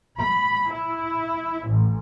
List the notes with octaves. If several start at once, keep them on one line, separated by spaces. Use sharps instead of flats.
B5
E4
A1